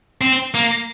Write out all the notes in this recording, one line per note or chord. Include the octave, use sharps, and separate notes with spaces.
C4
A#3